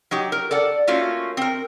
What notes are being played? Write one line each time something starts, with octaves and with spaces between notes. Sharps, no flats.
F#3 D#4 G4
A#4
A4 D5 F#5
A3 A#3 C#4 F4 F#4
C4 A#4